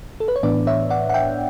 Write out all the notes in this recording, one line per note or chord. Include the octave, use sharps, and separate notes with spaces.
A4
B4
C#5
A2 E3 B3 D4 B4 D5
C#5 E5
D5 F#5
F#5
E5 G5